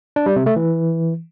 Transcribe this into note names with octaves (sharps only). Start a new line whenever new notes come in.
D4
G3
C3
A3
E3